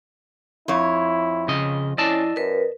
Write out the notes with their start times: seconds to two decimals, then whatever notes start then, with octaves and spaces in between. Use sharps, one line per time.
0.68 F2 E4 C#5
1.48 C#3 D#5
1.98 C#4 E4 D5 D#5 A5
2.36 F#2 A#4 B4